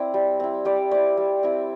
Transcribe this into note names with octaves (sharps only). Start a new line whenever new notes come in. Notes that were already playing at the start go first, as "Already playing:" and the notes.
Already playing: C4 E4 D5
G3
C4 E4
G3 D5
C4 E4 D5
G3
C4 E4